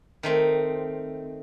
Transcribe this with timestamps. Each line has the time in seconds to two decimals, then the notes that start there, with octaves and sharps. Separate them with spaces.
0.23 D#3 A3 C4